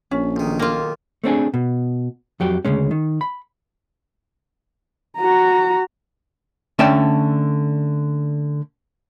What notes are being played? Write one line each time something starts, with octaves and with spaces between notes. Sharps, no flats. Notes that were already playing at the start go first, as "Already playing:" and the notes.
A#1 C#4
B1 D#3
A#3 F4
A3 C4 D4 G#4
B2
F2 F#3 G4
D2 G2 C#3 G#3 C#4
D#3
B5
F#4 A#5
D3 A3 C#4 D5 G5 A5